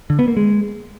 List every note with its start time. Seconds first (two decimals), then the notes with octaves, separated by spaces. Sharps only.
0.10 D3
0.19 B3
0.28 A#3
0.37 G#3